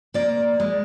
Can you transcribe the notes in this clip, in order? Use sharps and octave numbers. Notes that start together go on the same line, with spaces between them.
A#3 D5
G#3